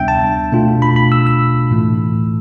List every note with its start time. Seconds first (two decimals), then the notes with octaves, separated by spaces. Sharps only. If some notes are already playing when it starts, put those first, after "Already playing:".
Already playing: D2 C3 G3 B3 D4 E5 G5
0.08 A5
0.52 B2 A3 D4 F4
0.82 B5
0.96 B5
1.12 E6
1.27 E6
1.71 A2 E3 A3